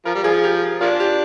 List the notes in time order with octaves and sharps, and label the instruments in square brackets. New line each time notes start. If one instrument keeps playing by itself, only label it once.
[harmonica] F3 [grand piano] A#4
[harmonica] G3
[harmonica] F3 [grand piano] G#4
[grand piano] G4
[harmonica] F3 A#3 D4 [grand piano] F4
[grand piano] G4